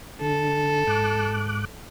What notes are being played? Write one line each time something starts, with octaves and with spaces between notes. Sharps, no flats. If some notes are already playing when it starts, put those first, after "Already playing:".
D3 A4
G#2 D6 F#6